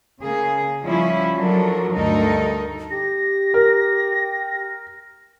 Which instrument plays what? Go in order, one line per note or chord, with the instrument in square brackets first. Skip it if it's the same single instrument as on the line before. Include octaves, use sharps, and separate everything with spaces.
[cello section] C#3 A#3 G#4
F3 G3 C#4 E4
F3 F#3 D4 A4 A#4
D2 G2 D#4 A4 A#4
[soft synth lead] G4 [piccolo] A#6
[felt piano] A#4